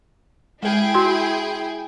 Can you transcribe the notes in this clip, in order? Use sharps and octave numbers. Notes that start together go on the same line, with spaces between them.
G#3 E4 G#4 G5
F#4 C6